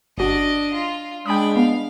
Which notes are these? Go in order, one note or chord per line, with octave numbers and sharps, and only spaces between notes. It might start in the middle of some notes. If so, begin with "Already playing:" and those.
G1 D4 F#4 D#5
F4
G#3 D4 G5 B5 D#6
B3 F5